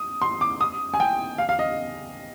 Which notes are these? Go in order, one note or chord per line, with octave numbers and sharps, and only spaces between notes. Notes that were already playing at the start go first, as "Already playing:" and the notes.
Already playing: D#6
C6
D6
D#6
G#5
G5
F5
F5
D#5